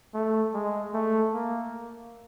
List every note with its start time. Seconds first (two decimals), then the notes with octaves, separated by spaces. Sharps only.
0.14 A3
0.54 G#3
0.94 A3
1.34 A#3